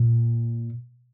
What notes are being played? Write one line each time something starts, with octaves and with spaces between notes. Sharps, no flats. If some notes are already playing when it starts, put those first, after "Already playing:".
Already playing: A#2